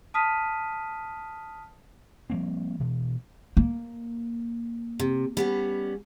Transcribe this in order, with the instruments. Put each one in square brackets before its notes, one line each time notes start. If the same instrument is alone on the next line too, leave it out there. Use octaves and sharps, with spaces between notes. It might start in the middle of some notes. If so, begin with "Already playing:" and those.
[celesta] A5 D#6 F6 B6 D#7
[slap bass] F3 G3 A#3 C4
B2 E3
[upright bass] A#3
[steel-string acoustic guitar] C3
G3 B3 C#4